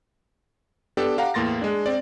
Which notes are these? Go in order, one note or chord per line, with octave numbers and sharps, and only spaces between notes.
B3 D4 G4 A4
G4 F5 F#5 A#5
E2 A2 A#3 C6 A6 A#6
G#3 D4
C4 D5